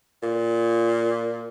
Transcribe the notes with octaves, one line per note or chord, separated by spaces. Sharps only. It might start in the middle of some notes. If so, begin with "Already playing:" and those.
A#2